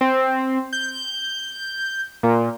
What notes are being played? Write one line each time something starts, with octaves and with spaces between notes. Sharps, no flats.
C4
G6
A#2